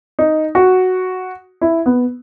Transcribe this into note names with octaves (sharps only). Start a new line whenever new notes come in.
D#4
F#4
E4
B3